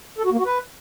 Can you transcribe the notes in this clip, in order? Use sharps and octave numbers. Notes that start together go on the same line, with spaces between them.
A4
F#4
A#3
F#4
B4